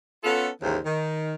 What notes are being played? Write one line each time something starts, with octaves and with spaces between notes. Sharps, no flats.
B3 C#4 F4 A4
D#2 G#2 C#3 E3 C5
D#3